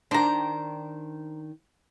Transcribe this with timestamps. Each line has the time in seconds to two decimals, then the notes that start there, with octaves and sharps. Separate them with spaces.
0.11 D#3 D4 C5 A#5